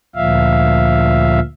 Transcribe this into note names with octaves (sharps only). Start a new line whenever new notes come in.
D2 A#2 F3 E5 F5